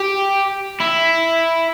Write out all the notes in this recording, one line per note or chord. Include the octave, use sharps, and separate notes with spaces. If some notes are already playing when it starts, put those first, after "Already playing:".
Already playing: G4
E4